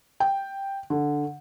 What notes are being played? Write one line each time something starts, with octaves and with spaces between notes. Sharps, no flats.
G5
D3